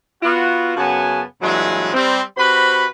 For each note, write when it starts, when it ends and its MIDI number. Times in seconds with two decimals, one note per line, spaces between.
0.23 0.73 59
0.23 0.73 65
0.23 0.73 66
0.76 1.21 42
0.76 1.21 49
0.76 1.21 59
0.76 1.21 66
0.76 1.21 80
0.76 1.21 81
1.41 1.91 43
1.41 1.91 46
1.41 1.91 52
1.41 1.91 54
1.41 1.91 56
1.94 2.21 55
1.94 2.21 60
2.36 2.86 48
2.36 2.86 66
2.36 2.86 71
2.36 2.86 72
2.36 2.86 83